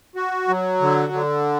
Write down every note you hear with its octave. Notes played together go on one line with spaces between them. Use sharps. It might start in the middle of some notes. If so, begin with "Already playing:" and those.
F#4
F#3
D3
D3